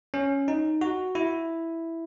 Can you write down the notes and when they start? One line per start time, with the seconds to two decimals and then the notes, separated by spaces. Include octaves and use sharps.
0.14 C#4
0.48 D#4
0.81 F#4
1.15 E4